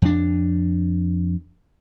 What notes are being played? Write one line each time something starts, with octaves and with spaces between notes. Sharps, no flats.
F2 D4